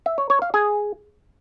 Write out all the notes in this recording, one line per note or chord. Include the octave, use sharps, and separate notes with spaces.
E5
C#5
C#5
F5
G#4